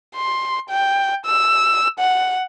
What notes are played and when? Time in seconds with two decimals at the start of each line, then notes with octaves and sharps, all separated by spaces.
0.16 C6
0.70 G5
1.26 E6
2.00 F#5